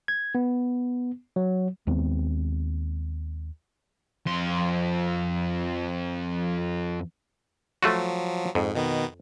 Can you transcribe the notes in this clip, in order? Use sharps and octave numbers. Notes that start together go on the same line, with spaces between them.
G#6
B3
F#3
D#2 G#3 B3 C4
F2 C6
F3 F#3 A3 F4 F#4
F2 G#2
B2 D#3 B3